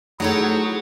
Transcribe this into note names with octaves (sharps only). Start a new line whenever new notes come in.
F#3 A3 D#4 E4 G#4 A4 C5 C#5